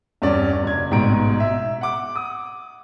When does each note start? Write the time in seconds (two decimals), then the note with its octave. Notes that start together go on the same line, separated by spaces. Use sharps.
0.22 E2 G2 C#4 D5
0.64 F#1 G#6
0.91 A1 G#2 B2 A#5 D7
1.40 E5
1.81 F#5 D6
2.16 D#6